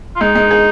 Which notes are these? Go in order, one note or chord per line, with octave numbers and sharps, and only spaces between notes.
F4
G#3 D#4
G#3
G#4